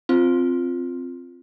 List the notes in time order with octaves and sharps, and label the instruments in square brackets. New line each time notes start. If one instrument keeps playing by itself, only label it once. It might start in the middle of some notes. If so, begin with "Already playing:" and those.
[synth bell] C4 F4